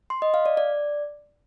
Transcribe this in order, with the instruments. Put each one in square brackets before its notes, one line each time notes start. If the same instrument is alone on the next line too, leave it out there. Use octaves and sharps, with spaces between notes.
[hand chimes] C6
D#5
F5
D5
D5